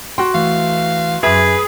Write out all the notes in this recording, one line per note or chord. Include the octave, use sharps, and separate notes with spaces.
F#4 G5 C6
E3 A3 F5
F#2 G#4 B4 E5